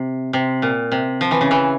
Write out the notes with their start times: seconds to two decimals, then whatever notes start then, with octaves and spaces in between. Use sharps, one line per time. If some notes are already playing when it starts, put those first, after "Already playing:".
Already playing: C3
0.33 C3
0.62 A#2
0.92 C3
1.21 F3
1.31 E3
1.41 C#3
1.51 E3